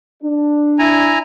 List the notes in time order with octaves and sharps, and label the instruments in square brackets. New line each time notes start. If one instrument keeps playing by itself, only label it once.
[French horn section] D4
[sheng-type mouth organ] E4 G#5 A#5